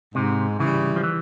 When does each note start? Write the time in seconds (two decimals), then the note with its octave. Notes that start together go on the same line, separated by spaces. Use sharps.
0.15 G#2 C3
0.59 C#3 E3 G3
0.96 F3
1.04 E3